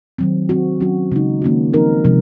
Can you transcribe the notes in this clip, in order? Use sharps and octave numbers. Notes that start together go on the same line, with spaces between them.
D#3 F#3 C4
F#3 C4 F#4
F#3 C#4 F#4
C#3 G#3 D#4
D#3 A#3 C#4 F#4
F3 C4 D#4 A#4
C3 F3 G#3